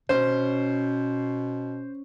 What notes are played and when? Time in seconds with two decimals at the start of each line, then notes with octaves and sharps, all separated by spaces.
0.09 B2 C#4 C5